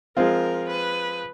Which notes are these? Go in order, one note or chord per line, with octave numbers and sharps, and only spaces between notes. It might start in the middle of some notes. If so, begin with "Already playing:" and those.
F3 G#3 C4 F4 A#4
B4